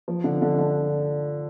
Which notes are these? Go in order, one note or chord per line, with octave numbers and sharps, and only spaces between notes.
F3
D3
D3
D3